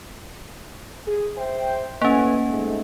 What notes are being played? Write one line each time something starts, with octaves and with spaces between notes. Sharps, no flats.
G#4
C5 E5 G5
A2 A#3 C#4 B4 G#5
G#2 A3